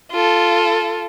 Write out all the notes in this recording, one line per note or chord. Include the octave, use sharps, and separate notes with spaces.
F4 A4